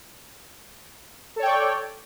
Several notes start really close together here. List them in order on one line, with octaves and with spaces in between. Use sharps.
A4 C#5 G5 D5